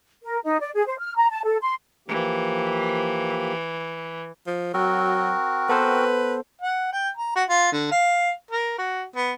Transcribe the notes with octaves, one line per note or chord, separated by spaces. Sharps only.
A#4
D#4
D5
G#4
C5
F6
A#5
A5
A4
C6
E3 F3 A#3 G4
F3
F#3 C4 F#4 A#4
B3 A4 B4 C5
F#5
G5
A#5
F#4
F4
D3
F5
A#4
F#4
B3